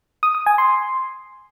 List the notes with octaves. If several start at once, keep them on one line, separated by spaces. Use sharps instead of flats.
D#6
D#6
G#5
C6